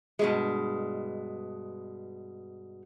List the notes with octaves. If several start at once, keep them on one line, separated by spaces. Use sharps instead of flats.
G2 B2 G#3